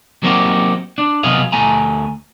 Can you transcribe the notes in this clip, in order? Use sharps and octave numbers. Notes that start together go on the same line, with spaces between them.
F#3 A#3 C4 D#4 F#4 G4
D4
C3 F#3 B3 G#4 D#5 F5
D2 A3 G#5 A#5